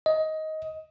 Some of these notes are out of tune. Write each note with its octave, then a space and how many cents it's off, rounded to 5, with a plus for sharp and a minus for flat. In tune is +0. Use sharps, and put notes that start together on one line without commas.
D#5 +15